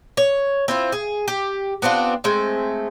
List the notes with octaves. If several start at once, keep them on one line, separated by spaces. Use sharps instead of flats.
C#5
C4 E4 F4
G#4
G4
B3 C4 D4 F4
G#3 A3 C4